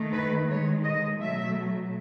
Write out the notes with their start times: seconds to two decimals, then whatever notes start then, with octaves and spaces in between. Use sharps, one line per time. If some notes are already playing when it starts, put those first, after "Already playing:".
Already playing: D#3 A3
0.13 B4
0.48 D#3 G#3 C#5
0.84 D#5
1.20 B2 F#3 A3 E5